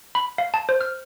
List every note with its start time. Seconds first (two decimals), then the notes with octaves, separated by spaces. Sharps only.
0.15 B5
0.38 F5
0.54 A5
0.69 C5
0.81 F6